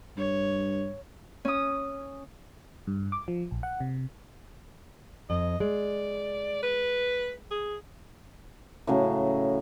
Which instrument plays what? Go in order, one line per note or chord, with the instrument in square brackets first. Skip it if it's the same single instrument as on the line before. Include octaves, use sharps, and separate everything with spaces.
[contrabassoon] G2 [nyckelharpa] C#5
[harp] C#4 D#6
[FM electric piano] G2
D6
F3
A#1
F#5
C3
[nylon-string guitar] F2 [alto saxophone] D#5
[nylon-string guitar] G#3 [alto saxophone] D5
[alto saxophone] B4
G#4
[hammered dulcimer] A2 C#3 F#3 A3